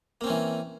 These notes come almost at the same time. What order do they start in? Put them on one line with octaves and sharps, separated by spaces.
A#3 C4 C#4 E3